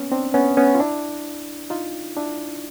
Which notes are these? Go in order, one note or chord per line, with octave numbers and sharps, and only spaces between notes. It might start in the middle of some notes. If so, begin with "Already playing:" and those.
Already playing: A#3 B3 C#4
C4 D4
B3 C#4
B3 C#4
F4
D4 E4
D#4 F4
D4 E4